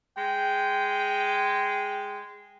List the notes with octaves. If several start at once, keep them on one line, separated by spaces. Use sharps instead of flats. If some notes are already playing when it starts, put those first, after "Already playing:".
G#3 G5